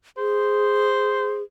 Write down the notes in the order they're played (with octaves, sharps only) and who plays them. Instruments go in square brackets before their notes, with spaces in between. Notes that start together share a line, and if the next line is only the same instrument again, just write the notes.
[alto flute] G#4 [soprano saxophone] C5